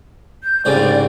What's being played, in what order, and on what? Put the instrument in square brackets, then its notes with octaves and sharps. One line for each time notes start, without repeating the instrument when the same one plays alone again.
[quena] G6
[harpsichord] C2 G#2 C#3 [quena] D5